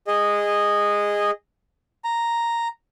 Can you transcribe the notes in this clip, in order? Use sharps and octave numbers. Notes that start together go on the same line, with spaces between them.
G#4 D#5
A#5